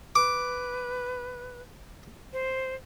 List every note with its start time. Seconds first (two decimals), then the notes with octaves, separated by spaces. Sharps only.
0.16 B4 D6
2.33 C5